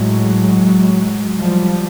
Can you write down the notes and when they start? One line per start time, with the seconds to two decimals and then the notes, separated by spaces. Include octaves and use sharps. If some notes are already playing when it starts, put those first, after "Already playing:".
Already playing: A2 F#3 G#3
1.39 F3 G3